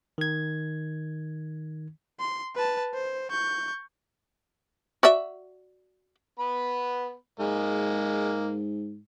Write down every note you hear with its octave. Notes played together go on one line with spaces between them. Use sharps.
D#3 G#6
C6
B4 A5
C5
C#6 G6
F#4 D5 E5
B3 B5
G#2 G#3 A#3